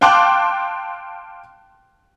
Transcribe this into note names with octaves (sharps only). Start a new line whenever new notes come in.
F5 G5 A5 C6 D6 F#6